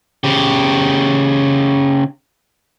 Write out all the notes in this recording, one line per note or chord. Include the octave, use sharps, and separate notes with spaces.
C#3 G4